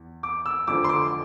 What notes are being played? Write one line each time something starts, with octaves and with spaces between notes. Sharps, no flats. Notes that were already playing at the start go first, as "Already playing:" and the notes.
Already playing: E2
D6
E6
F1 F2 D3 F3 D6
C6
D6